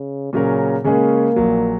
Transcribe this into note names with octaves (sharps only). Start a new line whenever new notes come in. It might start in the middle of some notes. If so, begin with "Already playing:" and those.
Already playing: C#3
A#2 C#3 F#3 C#4 A#4
C#3 G#3 A#3 C#4 G#4
A#1 A#2 F#3